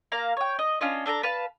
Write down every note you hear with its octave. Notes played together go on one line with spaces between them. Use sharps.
A#3 F5 A#5
C#5 G5
D#5
C#4 D4 F4 D#5
D4 A4 G5 A#5
B4 F5 A5